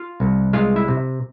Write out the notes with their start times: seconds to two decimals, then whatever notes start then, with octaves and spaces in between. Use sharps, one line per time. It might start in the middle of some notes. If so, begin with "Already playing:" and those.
Already playing: F4 F5
0.20 C2
0.53 G#3 F4 F5
0.76 E4 E5
0.88 C3